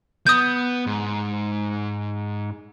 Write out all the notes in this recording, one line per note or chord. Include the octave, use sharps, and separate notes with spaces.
B3 D#6 G6
G#2